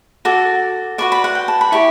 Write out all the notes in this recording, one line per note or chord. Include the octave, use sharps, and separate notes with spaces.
F#4 A4 D6
F#4 B4 D5 C#6
B5
F#5
G5
A5
B5
E4 G4 D5 C#6